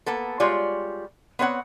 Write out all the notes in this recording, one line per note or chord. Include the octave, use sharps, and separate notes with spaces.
A#3 B3 A4
G3 G#3 F4 C#5 D5
B3 C4 C#5 F#5